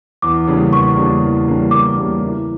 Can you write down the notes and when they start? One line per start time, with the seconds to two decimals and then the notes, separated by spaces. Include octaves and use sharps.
0.22 E2 D6
0.47 C#3 G3 A#3 D4
0.72 E2 C#6
0.98 C#3 G3 A#3 D4
1.21 E2
1.47 C#3 G3 A#3 D4
1.71 E2 D6
1.97 C#3 G3 A#3 D4
2.22 E3